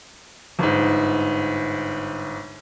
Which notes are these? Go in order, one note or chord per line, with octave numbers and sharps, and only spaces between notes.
G1 G#2